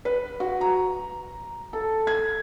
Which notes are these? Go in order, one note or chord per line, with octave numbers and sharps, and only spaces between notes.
B4
F#4
A#5
A4
G#6